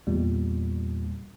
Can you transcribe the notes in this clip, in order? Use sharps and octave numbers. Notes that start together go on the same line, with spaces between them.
E2 A#2 G3